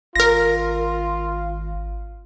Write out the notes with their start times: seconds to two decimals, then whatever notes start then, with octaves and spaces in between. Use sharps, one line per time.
0.16 G#1 F4 A#4 A#6